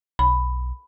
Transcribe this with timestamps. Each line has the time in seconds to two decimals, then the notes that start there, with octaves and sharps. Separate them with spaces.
0.19 B1 B5